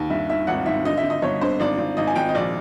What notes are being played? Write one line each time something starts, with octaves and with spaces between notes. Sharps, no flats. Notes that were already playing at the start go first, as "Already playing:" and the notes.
Already playing: D#2
G2 E5
D#3 E5
G#1 F#5
G#1 E5
D3 D#5
E5
D3
D#5
G1 C#5
D3 C5
G#1 D5
G#1
G#1 D#5
G#5
G#1 G5
D#5
A#1 D5